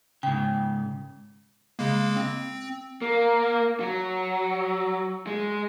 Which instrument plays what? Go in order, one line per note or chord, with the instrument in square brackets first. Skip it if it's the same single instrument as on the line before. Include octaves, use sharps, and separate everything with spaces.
[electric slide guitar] G#2 C#3 [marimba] G5
[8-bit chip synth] C#3 G#3 A#3
C4
[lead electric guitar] A#3
F#3
G#3